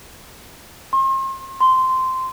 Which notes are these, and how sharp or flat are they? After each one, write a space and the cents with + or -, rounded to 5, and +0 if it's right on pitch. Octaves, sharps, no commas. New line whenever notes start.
C6 +40
C6 -10